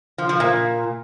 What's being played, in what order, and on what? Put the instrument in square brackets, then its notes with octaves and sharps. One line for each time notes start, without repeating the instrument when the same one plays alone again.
[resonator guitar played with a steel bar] F3
F3
A#2